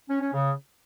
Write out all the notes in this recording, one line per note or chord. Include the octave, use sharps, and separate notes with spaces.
C#4
C#4
C#3